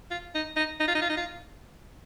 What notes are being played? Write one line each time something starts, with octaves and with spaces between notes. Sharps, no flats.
F4
D#4
D#4
D#4
F4
D#4
F4
D#4
F4